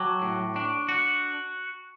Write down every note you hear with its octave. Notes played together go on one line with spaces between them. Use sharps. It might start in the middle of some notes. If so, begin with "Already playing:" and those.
Already playing: F#3 G5 A5 C#6 D6
A2
D4 C#6
F#4